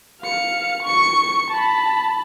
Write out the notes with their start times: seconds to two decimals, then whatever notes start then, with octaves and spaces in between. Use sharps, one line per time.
0.21 F5 C#7
0.83 C#6 C#7
1.50 A5 B5